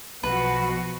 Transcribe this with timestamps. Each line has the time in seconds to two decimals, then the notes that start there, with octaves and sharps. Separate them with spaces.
0.23 B1 B2 F3 F#4 B4